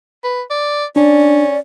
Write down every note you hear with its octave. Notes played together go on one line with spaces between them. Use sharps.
B4
D5
C#4 D4 D5